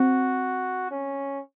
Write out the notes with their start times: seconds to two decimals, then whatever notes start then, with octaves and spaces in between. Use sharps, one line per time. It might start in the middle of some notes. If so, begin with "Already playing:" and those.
Already playing: C4 F#4
0.91 C#4